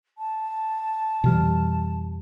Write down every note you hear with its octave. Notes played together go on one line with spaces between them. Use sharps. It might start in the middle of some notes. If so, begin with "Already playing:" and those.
A5
F2 B2 E3 G3 G4 F6